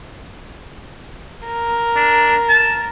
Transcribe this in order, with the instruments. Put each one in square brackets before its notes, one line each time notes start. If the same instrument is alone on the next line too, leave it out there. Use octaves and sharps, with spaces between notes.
[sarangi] A#4
[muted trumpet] D4
A5